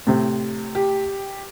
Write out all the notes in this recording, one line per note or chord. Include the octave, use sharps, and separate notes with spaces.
A2 C3
G4